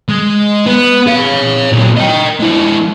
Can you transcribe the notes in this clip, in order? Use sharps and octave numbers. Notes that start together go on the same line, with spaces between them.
G#3
B3
C#5 F5
A#2 F#3
D#5 G5
G#3 E4